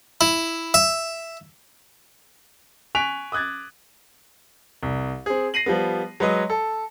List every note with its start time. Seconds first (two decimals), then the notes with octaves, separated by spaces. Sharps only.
0.21 E4
0.74 E5
2.95 G#5 C#6 F#6 B6 D7 F7
3.32 D6 D#6 F#6 G#6 A6
4.83 C2
5.26 C4 G#4
5.54 A#6 C7 D#7 F#7
5.66 F3 G3 B3
6.20 F#3 G#3 B4 D#5
6.50 A4